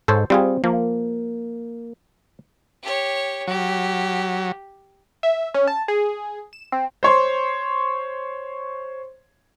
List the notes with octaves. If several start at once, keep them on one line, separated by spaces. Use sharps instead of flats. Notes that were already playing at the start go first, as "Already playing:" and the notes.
G#2 A4 C5 C#5
G3 C4 F4 G#4
F3 A#3
G4 C#5
F#3 G4
E5
C#4
A5
G#4
E7
C4
C5 C#5 C6